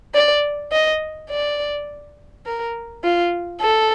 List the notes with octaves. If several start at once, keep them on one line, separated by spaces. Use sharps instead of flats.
D5
D#5
D5
A#4
F4
A4